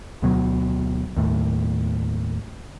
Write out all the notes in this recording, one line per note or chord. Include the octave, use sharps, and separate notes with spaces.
D2 B2 F#3
D#2 A2